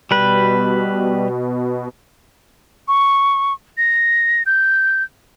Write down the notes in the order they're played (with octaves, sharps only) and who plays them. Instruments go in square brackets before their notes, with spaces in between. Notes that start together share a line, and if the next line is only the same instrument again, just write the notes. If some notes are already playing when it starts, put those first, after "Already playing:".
[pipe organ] B2 [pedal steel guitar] G3 B4
[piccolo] C#6
A#6
G6